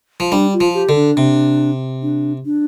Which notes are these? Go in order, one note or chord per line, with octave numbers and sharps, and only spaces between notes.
F3
G3 D4
F4
F3
G4
D3
D4
C3
D4
D4